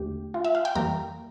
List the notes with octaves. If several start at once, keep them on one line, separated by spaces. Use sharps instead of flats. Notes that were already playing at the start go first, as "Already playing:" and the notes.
Already playing: E2 D3 A3 G4
F4
E5
F5
G5
F2 E3 G3 A#3 A#5